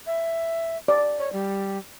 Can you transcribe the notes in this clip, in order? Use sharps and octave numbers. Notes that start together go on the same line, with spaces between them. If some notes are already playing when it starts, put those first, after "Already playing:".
E5
D5
C#5
G3